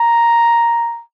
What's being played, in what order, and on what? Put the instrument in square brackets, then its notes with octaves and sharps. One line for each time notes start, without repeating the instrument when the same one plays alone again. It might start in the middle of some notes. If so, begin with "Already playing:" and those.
Already playing: [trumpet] A#5